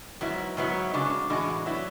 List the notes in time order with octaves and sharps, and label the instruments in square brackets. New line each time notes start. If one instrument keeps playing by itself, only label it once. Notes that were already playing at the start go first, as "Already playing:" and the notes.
[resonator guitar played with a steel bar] G#2 F#3 B3 E4
G#2 F#3 B3 E4
C#3 G#3 D4 F#4
A2 E3 G#3 D4 F#4
F#3 B3 E4